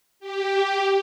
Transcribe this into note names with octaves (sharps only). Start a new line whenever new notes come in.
G4